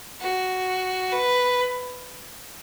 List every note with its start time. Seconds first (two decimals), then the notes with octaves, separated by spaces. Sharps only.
0.20 F#4
1.12 B4